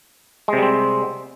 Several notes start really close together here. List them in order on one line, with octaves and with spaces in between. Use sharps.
G#3 C3 G3 C4